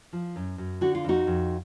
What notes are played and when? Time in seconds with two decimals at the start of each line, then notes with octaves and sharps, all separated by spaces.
0.13 F3
0.36 F#2
0.58 F#2
0.81 D3 F#4
0.95 F4
1.04 F2 D#4 F#4
1.27 F2